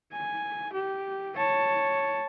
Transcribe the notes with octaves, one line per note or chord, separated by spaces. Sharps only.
G#5
G4
C#5 A5